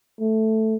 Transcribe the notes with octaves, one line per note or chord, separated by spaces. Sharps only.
A3